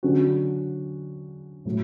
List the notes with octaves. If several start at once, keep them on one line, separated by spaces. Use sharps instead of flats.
D3 F#3 C#4 F#4
A2 F#3